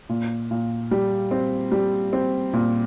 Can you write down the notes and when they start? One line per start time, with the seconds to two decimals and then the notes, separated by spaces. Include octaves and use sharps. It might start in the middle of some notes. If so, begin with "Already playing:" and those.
0.09 A#2
0.51 A#2
0.91 G3
1.31 C4
1.72 G3
2.13 C4
2.54 A#2